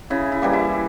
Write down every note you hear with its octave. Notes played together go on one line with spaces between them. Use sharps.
C#3 E4
E4
E3 G3 A#3
E4